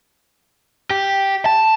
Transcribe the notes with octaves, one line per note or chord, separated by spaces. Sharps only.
G4
A5